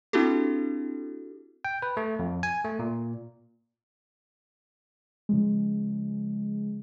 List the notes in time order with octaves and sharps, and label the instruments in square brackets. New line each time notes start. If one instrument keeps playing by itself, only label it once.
[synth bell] C4 D4 E4 F#4 G4 A4
[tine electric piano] G5
B4
A3
F2
G#5
A3
A#2
[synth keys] C#3 F3 G#3